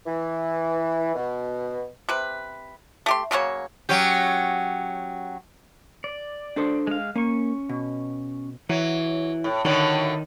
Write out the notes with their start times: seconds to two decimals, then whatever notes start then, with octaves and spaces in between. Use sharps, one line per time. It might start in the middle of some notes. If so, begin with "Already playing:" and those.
0.07 E3
1.15 B2
2.09 C3 B4
3.06 A3 G4 C6
3.31 C#3 F#3 A#3 C#5
3.89 F#3 C#4 G4
6.04 D5
6.56 D4 A4 C5
6.87 G#3 F5
7.16 A#3 C#4 C#6
7.69 B2
8.69 E3 F#3
9.44 A2
9.65 A2 D3 D#3 F#3